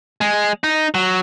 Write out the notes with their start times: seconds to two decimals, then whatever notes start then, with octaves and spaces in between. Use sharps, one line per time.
0.21 G#3
0.64 D#4
0.94 F#3